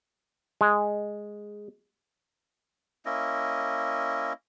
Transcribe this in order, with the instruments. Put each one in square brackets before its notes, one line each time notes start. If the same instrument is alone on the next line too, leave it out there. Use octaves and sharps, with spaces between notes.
[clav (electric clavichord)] G#3
[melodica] A#3 C#4 E4 D#5